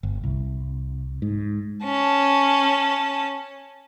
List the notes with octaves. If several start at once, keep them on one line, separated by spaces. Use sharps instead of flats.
G1
C2
G#2
C#4 A5